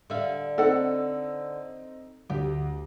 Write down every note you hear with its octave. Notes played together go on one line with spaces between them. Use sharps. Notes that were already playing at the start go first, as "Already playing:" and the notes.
D3 E5 F5
C4 D#4 A4 F#5 E6
D2 G4